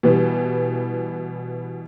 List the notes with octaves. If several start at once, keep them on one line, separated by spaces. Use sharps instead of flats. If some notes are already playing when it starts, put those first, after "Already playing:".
B2 E3 G3